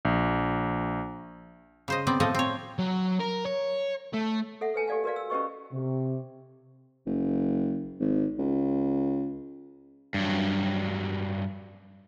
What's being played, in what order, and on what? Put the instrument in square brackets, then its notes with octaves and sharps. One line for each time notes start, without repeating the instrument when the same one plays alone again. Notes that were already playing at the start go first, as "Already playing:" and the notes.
[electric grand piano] A#1
[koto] C#3 C5 D#5
B3 C4 D5
A2 F3 A4 D#5 A5
C4 C#5
[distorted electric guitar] F#3
A#4
C#5
A3
[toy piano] A4 E5 F#5
A4 B4 G#5 A5
G4 A4 D5 F5 G#5
F#4 A#4 B4 D5 F5
E6
C#4 E4 G4 B4 D#5 C#6
[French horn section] C3
[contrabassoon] F#1
G#1
C#2
[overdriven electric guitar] G2 F#3